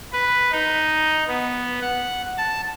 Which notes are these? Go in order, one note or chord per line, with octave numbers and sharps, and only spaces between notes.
B4
D#4
B3
F#5
A5